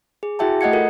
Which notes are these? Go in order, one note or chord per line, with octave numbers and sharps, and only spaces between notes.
G#4
E4 F#4 G#4 E5 G5 A5
A3 D#5 F#5 G#6 C#7
F4 A4 A#4 F#5